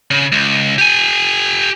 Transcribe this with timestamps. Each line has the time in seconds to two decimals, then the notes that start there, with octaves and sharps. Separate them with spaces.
0.11 C#3
0.32 C#2
0.78 G4 G#5